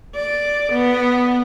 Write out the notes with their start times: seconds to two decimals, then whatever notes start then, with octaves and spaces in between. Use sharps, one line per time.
0.16 D5
0.72 B3